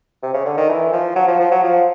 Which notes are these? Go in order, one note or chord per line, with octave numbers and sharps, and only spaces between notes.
C3
C#3
D3
D#3
E3
F3
F#3
F3
F3
F#3
F3